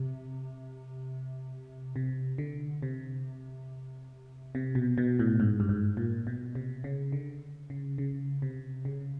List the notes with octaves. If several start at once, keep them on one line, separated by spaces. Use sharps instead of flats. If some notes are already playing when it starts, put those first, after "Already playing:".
Already playing: C3
C3
D3
C3
C3
B2
B2
A2
G#2
G2
G#2
A#2
B2
C3
C#3
D3
C#3
C#3
C3
C#3